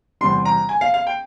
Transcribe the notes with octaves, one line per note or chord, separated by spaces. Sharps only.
E2 C3 G3 C6
A#5
G#5
F5
F5
G5